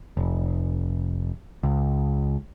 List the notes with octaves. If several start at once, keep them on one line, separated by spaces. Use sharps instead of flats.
F1
C#2